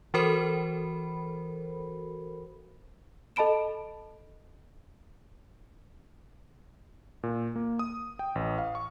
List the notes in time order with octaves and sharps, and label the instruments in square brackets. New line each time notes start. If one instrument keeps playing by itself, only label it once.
[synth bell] E3 F#4 A4 A#4 C5 B5
[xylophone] A4 D#5 A5 B5 D7 E7
[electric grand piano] A#2
A#3
D#6
G5
A1
F5
C#6